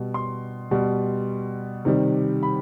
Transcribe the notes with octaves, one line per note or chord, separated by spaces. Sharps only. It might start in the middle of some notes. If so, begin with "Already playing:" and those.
Already playing: B2 G3
C6
B2 G3
C3 D#3 G3
B5